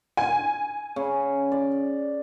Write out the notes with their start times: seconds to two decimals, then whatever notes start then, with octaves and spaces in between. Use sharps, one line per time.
0.17 G#5
0.96 C#3
1.52 D5